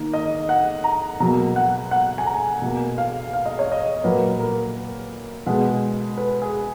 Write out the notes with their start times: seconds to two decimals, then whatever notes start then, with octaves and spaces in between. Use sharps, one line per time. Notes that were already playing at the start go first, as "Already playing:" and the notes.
Already playing: D#3 A#3
0.14 D#5
0.49 F#5
0.84 A#5
1.20 B2 F#3 A#3 A#5
1.56 F#5
1.91 F#5
2.18 G#5
2.26 A#5
2.62 B2 A#3
2.98 F5
3.33 F5
3.46 D#5
3.59 C#5
3.72 D#5
4.04 A#2 F#3 A#3 B4
4.40 A#4
5.46 B2 G#3 B3
6.18 B4
6.42 G#4